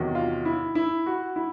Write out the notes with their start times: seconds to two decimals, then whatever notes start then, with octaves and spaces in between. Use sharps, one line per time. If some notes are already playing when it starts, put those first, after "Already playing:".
Already playing: E2 C3 D#3 F#3
0.15 F4
0.45 E4
0.75 E4
1.06 F#4
1.36 E4